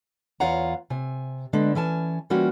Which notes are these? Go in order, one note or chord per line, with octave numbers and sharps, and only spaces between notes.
E2 F4 C#5 F5 F#5 A#5
C3 G#5
D3 G#3 B3 D4
E3 C#4 G#5 A5
E3 G3 A#3 C#4 F4 F#4